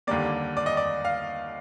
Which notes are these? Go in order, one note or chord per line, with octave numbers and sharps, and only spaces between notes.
D#2 D3 G3 A#3 D5
D5
D#5
D5
F5